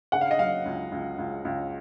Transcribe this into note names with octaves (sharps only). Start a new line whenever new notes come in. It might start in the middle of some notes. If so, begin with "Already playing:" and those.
C#3 F#5
F5
D#5
F#3 F5
C#2
C#2
C#2
C#2